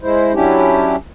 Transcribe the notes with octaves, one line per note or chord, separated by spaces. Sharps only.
G#3 E4 C5
F#3 C#4 D4 E4 G4